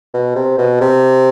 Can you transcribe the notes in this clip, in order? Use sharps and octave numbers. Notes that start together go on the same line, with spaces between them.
B2
C3
B2
C3